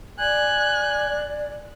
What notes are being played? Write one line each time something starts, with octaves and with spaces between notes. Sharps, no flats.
D5 G#5 F#6